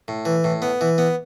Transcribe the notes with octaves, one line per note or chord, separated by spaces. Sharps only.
A2
E3
A2
B3
E3
B3